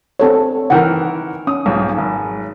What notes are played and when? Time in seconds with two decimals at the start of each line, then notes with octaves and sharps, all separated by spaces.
0.20 C4 A4 C#5
0.70 D#3 E3 A#4 F#5 G5
1.47 C#4 D#6
1.66 B1 G#2 F3
1.98 G#1